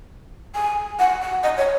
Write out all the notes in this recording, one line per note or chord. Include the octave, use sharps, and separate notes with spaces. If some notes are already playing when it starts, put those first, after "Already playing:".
G#5
F#5
F#5
D#5
C#5